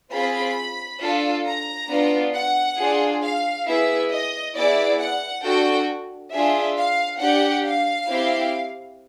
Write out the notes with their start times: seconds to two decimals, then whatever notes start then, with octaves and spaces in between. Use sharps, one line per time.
0.12 C4 F4 G#4 B5
1.01 D4 F4 A4
1.46 A#5
1.89 B3 D4 F4
2.34 F#5
2.78 D4 F4 G#4
3.23 F5
3.66 B3 E4 G#4 E5
4.11 D#5
4.55 B3 E4 G#4 D5
5.00 F#5
5.44 D4 F#4 A4 G5
6.32 D4 F4 G#4 E5
6.77 F5
7.20 D4 G4 F#5
7.65 F5
8.09 C4 E4 G4